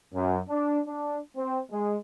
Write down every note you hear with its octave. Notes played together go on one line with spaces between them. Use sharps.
F#2
D4
D4
C4
G#3